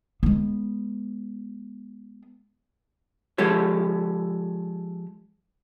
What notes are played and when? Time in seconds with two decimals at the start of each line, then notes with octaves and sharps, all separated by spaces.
0.23 G#3 B3
3.38 F3 G#3 G4 A4 C#5